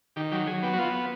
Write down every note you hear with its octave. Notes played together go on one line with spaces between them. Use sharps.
D#3 G4
F#3 G4
F#3 G#4
B3 G4
F#4
B3 F4